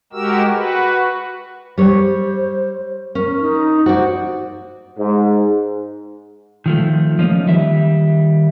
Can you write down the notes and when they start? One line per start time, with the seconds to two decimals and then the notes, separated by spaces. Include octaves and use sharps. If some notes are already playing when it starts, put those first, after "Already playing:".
0.13 G#3 F#4 G4 A#4 E6
0.53 F#4 B4
1.77 G3 C5 C#5
3.15 C#4 A#4
3.41 D#4
3.86 F#4 C5 D5
4.98 G#2
6.66 D#3 F3 A3
7.19 F3 A#3 C#4 D#4
7.46 D#3 G3 E5